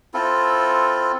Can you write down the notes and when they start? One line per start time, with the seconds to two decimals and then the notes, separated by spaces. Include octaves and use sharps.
0.14 C4 E4 F4 A4